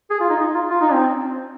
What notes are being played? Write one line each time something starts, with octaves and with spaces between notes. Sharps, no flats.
G#4
F4
D#4
D#4
F4
F4
D#4
C4